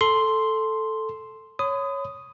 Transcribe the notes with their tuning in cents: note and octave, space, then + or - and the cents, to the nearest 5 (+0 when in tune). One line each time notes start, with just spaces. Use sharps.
A4 +0 C6 +0
C#5 +0 B5 +40 D#6 +0